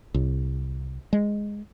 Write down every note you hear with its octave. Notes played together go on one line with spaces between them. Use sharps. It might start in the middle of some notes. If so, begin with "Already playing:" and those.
C2
G#3